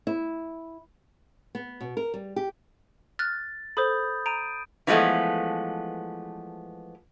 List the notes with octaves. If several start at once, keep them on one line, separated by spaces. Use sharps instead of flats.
E4
B3
B2
A#4
G3
G4
F6 F#6 A6
A4 C5 B5 D#6 G6
A#5 D7 D#7
E3 F3 G#3 A3 B3